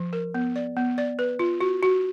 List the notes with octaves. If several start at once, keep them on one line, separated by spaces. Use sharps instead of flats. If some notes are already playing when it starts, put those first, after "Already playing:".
Already playing: F3
A#4
B3
D5
B3
D5
B4
F4
F#4
F#4